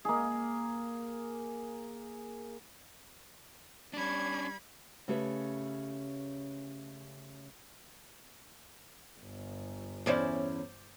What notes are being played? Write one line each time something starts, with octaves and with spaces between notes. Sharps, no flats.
A#3 G#4
G3 C#4 D4 B5 G#6
C#3 A3 C#4 G4 B4 E5
G1
E2 C#4 E4 C5 D5